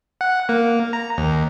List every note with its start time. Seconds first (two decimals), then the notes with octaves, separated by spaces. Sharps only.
0.21 F#5
0.49 A#3
0.93 A#5
1.18 D#2